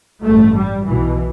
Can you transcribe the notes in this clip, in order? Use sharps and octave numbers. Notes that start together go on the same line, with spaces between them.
A1 G2 A3
G3
B1 B2 E3